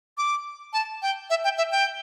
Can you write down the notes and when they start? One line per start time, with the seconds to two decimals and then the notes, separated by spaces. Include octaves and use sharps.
0.18 D6
0.73 A5
1.02 G5
1.30 E5
1.44 G5
1.58 E5
1.72 G5